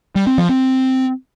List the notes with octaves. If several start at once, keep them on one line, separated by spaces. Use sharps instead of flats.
G3
C4
F3
C4